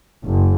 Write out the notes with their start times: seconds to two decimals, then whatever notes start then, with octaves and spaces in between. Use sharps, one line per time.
0.24 F#1